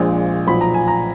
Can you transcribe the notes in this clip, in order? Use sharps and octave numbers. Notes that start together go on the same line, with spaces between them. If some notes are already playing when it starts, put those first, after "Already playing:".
Already playing: A#1 A#2 F3 G#3
B1 A#2 F3 B5
A#5
G#5
A#5